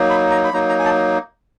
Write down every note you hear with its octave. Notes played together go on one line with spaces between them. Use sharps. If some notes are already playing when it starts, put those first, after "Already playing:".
Already playing: F#3 A#3 D#4
B5
A#5
B5
F#3 A#3 D#4 A#5
A#5
G#5
A5